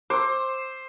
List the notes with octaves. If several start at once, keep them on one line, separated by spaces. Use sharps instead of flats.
C5 D6 E6